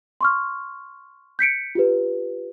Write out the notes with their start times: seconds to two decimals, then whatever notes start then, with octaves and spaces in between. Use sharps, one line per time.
0.21 C6 C#6 F6
1.39 G6 B6 C#7 D7
1.75 F4 G4 B4